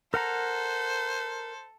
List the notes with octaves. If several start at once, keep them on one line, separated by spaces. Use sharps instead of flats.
A4 A#4 C5 F#5 A#5